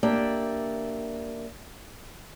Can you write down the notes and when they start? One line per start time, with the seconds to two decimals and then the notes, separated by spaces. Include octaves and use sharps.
0.03 A#3 D4 G4 D5 E5